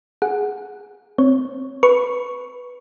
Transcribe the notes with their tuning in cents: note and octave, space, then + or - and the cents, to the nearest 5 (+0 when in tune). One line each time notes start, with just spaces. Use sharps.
G#4 +0 F#5 +0
C4 +0 C#5 +0
B4 +0 C#6 +0